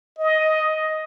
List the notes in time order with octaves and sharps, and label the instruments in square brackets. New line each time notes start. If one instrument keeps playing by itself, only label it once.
[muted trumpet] D#5